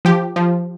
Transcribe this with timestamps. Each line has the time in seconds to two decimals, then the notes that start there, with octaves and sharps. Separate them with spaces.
0.05 F3 G4
0.36 F3